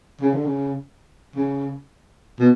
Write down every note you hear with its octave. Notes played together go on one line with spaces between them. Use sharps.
C#3
D3
C#3
C#3
B2